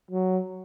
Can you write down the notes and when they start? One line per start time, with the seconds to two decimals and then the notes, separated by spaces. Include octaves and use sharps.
0.11 F#3